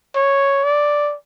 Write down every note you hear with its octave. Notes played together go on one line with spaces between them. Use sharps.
C#5
D5